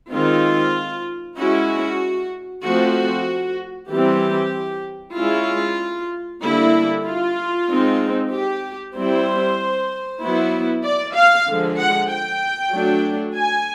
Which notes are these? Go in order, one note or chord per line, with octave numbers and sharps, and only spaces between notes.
D#3 G#3 C4 D#4 F4
G#3 C#4 E4 F#4
F3 A3 C4 F#4
E3 G3 C4 G4
G#3 C#4 E4 F4
D3 G3 A#3 D4 E4
F4
G#3 C4 D#4
G4
G3 C4 E4 C5
F#3 B3 E4
D5
F5
D3 F3 G#3
F#5
G5
F#3 A3 D4
G#5